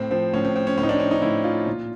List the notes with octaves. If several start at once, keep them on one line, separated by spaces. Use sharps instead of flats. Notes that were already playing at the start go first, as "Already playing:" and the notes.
Already playing: A2 C4
F3 C4
A2 C#4
C4
F3 C4
C#4
A2 C#4
D#4
D4
F3 C#4
D#4
A2 E4
F3 F4
A#2